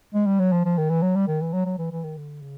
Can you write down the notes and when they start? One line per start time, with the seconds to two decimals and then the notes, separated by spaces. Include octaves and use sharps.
0.14 G#3
0.26 G3
0.40 F#3
0.52 F3
0.65 F3
0.78 D#3
0.90 E3
1.02 F#3
1.15 G3
1.28 D#3
1.41 E3
1.53 F#3
1.66 F#3
1.78 E3
1.92 E3
2.04 D#3
2.17 D3
2.42 C#3